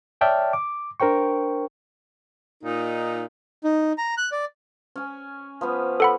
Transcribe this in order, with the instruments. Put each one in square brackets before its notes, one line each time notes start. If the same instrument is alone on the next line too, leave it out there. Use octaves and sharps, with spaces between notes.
[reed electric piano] C#5 D5 E5 G5 A5 F6
D6
D4 A#4 C5 G5 C#6
[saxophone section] A#2 D#4
[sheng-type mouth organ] D#4
A#5
F#6
D5
[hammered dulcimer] C#4 G#5
F3 B3 C#4
[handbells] A4 F#5 B5